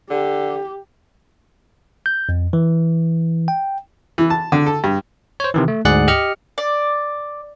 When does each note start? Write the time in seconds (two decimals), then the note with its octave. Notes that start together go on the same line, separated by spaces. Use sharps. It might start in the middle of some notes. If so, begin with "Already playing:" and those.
0.10 D3 G4
2.06 G6
2.29 F2
2.53 E3
3.48 G5
4.18 E3
4.30 A5
4.52 D3
4.66 A4
4.84 G2
5.40 C5 C#5
5.54 C3 D#3 E3
5.68 A3
5.85 D2 G#2 G#4 D5 F#5 F#6
6.08 G4 D#5 F6 C#7
6.58 D5